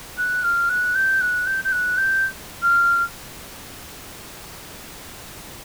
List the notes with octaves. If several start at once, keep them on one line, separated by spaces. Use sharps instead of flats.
F#6
F6
F#6
G6
F#6
G6
G6
F#6
G6
F6